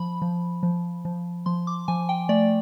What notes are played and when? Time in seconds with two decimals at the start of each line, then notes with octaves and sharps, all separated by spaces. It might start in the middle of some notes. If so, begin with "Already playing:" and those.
Already playing: F3 B5
0.22 F3
0.63 F3
1.05 F3
1.46 F3 C6
1.67 D6
1.88 F3 G#5
2.09 G5
2.29 A3 D5